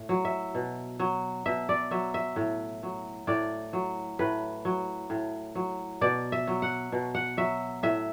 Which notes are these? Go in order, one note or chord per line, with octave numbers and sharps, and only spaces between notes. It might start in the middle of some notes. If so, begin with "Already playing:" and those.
Already playing: A2
F#3
E5
B2
F#3
B2 E5
D5
F#3 E5
E5
A2
F#3
A2 D5
F#3
A2 B4
F#3
A2
F#3
B2 D5
E5
F#3
F#5
B2
F#5
F#3 E5
A2 E5